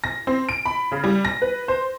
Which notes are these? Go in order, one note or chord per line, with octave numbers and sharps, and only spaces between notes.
A#6
C4
D7
B5
C#3
G3
A#6
B4
C5